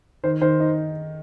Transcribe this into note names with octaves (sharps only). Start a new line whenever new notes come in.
D#3 C5
D#3 C5
D#4